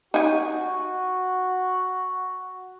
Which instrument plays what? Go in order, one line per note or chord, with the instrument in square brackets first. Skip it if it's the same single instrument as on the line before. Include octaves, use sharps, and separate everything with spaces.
[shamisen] D#4 G#5 [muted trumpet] F#4